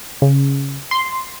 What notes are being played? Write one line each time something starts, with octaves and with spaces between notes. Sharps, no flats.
C#3
C6